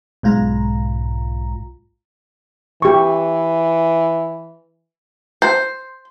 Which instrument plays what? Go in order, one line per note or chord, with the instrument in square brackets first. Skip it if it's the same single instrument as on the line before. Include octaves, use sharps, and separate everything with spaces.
[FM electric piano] B1 G#2 F4 A#5
[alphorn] E3 [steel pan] G4 C#6
[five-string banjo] C5